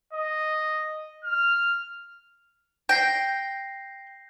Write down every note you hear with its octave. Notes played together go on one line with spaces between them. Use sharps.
D#5
F6
G5 G6 A#6 C7